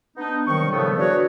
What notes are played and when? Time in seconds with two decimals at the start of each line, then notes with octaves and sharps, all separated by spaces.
0.16 B3 D4 D#4
0.46 C3 D#3 F#3 G3 C#6
0.70 A2 C#3 F3 G3 A3 B3
0.98 D4 F#4 G#4 B4 C#5